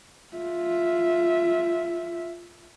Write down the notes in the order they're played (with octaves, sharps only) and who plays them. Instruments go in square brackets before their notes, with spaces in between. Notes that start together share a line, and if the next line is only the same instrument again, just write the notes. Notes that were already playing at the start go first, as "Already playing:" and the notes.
[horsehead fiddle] F4 E5